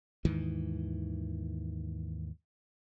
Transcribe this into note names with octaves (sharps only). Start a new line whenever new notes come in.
D#2 G#2 D#3 E3